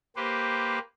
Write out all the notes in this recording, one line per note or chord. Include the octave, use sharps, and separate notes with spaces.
A#3 G4 B4 C5